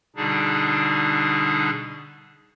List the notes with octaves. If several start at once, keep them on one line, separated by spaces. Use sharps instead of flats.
B2 D3 G3 D4 D#4 G#4